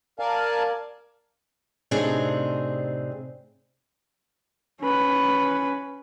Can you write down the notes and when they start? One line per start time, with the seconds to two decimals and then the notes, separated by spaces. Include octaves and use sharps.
0.20 A#4 D5 F5 G#5 A5
1.91 A2 C3 C4 D4 D#4 G#4
4.81 C#4 B4